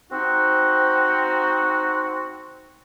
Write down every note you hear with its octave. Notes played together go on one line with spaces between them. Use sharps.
C4 D#4 F#4